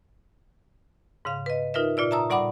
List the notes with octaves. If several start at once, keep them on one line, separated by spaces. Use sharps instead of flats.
G#2 C#3 F5
B4 D#5
D#4 F4 A#4 B4 E5
A#2 F4 D5 E6
E5 A5 A#5 D#6 E6
A2 G3 D5 F#5 B5 D6